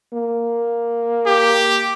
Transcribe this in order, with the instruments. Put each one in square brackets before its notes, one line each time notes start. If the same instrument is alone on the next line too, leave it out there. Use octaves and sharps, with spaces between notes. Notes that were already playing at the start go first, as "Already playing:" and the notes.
[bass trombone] A#3
[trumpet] G4